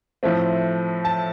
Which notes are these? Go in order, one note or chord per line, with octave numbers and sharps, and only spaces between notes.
A2 F3 A3 C4
A5